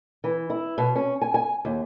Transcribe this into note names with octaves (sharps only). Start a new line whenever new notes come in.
E3
E4
B2
C#4
G#5
G#5
D#2